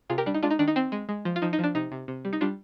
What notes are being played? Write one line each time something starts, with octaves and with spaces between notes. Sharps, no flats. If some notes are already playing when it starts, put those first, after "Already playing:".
C3 F4 G#4
G4 A#4
G3 D4
D#4
G#3 D4 F4
D#4
D#3 D4
D#4
C4
G#3
G#3
F3
F4
F3 D#4
D#4
F3 D4
C3 D#4
C3
C3
G3
D#4
G3 D4 F4